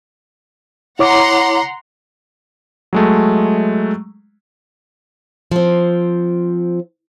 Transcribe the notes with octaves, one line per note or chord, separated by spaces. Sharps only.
E4 C#5 F#5 A#5 C6 D6
F#3 G#3 A3
F3 C4